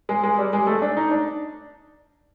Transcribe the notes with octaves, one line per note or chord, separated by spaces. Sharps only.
G#3
G#3
G3
G#3
A3
D4
D#4
D4